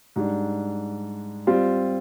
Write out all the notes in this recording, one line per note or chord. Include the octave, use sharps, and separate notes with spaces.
G#2 G3 D4
G3 C4 F4